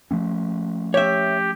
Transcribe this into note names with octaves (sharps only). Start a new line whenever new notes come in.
F3 A3 C#4
G4 C#5 E5